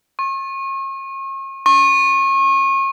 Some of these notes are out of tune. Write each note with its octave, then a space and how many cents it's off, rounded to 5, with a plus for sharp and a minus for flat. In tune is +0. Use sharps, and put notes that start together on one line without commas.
C#6 -40
C#6 -35